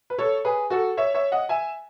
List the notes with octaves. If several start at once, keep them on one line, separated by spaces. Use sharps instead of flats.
B4
A4 C#5
G#4 B4
F#4 A4
C#5 E5
C#5 E5
D#5 F#5
E5 G#5